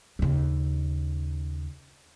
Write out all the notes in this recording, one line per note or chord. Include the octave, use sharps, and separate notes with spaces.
D#2 C#3